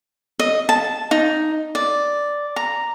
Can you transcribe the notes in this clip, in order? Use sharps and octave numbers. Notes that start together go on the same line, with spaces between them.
D#5
A5
D#4
D5
A#5